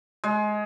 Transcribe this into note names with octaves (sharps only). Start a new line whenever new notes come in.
G#3